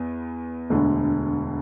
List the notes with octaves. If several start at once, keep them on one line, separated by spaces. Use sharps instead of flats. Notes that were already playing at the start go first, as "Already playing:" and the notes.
Already playing: E2 B3
E1 D2 D3